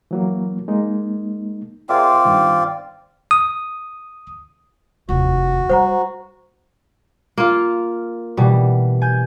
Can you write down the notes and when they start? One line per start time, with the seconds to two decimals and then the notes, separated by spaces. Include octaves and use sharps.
0.11 E3 F#3 A#3
0.68 G#3 A#3 D#4
1.89 C4 F4 G#4 A#4 D5 E5
2.25 G2 D#3
3.31 D#6
5.09 F1 D#2 F#4
5.69 G3 C5 F#5 A#5
7.38 A#3 F4
8.37 B2 E3 G3
9.02 G#5 G6